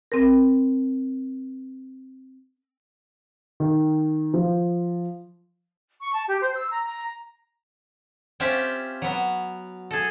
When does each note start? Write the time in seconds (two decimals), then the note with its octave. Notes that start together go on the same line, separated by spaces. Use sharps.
0.12 C4 A#4
3.60 D#3
4.34 F3
6.00 C#6
6.13 A5
6.28 G4
6.41 C5
6.55 E6
6.71 A#5
6.84 A#5
8.40 C4 C#4 F4 G4 E5 G5
9.02 F#3 B3
9.91 G#4 A4